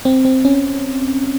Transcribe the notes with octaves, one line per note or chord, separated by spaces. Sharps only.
C4
C4
C#4